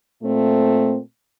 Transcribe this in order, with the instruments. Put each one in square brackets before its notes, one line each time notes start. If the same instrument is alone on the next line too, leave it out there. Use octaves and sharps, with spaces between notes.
[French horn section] A#2 A3 C4